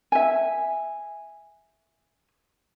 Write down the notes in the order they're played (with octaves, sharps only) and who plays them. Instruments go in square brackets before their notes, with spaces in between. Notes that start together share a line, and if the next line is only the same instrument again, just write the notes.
[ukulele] E5 G#5